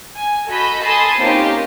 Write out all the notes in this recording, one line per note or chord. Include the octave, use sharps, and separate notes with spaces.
G#5
F#4 A4 D#5 B5 G6 B6
A4 G#5 A5 B5 C6 D#6
A#3 C4 C#4 D#4 F4 G4